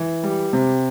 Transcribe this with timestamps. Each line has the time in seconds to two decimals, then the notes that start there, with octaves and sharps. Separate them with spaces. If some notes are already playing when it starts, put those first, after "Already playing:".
Already playing: E3
0.23 G3
0.53 C3